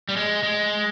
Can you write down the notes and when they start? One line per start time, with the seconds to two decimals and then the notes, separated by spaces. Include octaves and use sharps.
0.09 G3
0.17 G#3
0.43 G#3